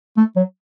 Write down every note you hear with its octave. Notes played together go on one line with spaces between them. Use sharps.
A3
F#3